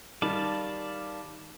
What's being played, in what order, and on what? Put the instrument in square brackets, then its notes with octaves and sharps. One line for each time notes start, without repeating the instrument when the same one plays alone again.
[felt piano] D#3 G3 [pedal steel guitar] D5 F5 A5